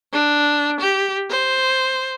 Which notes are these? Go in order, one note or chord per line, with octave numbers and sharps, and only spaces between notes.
D4
G4
C5